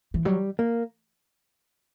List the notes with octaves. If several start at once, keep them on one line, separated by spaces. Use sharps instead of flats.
E3
F#3 G3
A#3